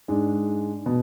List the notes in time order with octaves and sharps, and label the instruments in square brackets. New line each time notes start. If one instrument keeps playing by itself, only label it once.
[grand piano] G#2 G#3 D4
B2